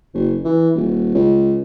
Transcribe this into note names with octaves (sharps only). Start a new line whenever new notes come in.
F#1
E3
D#1
C#2